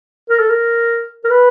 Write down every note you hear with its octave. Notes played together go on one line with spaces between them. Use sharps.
A#4
A4
A#4
A#4
B4